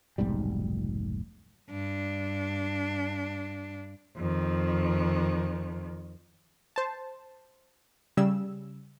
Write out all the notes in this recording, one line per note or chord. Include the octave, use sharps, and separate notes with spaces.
F1 B1 G#2 G3
G2 D4
F2 D#3
C5 A5
C#3 G3 E6